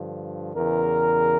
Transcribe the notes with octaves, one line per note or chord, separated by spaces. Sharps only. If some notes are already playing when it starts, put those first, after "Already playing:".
Already playing: G2 D3 F3
E2 C#3 E3 A#4